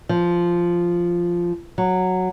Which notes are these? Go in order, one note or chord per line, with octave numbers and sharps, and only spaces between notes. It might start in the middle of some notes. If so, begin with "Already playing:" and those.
F3
F#3